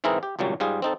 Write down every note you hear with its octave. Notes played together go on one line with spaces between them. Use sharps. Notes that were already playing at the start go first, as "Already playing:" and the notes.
G#2 E3 C4 E4 G#4 A#4
G4
G#1 C#2 A#2 F#3 G3
G#2 G3 F4 G#4
C4 D#4 A4